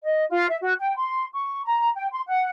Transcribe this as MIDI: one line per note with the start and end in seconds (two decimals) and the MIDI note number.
0.03 0.23 75
0.30 0.45 65
0.48 0.56 76
0.61 0.73 66
0.79 0.95 79
0.96 1.24 84
1.32 1.62 85
1.63 1.89 82
1.94 2.06 79
2.11 2.21 84
2.26 2.49 78